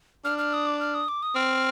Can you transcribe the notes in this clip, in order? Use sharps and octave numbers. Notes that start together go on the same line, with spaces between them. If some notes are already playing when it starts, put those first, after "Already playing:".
D4 F6
F6
D#6
D6
F6
D#6
D6
D#6
C4 F6